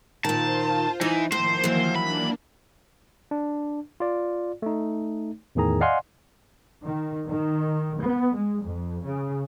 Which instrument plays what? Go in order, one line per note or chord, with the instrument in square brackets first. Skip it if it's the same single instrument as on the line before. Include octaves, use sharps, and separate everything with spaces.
[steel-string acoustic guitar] A#2 D#3 [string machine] F4 C5 [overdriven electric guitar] A5
[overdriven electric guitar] E3 [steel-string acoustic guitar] D#4
[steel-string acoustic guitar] A2 [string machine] D#3 F3 A#3 [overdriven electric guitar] C5
[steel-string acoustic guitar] E3 F#3
[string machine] A#3 D4 [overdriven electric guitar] B5
[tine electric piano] D4
F4 D5
A3 D#4
E2 A2 D#3 G#4 A#5
D5 D#5 F5 F#5 G#5 C6
[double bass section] D#3
D#3
B3
G#3
F2
C#3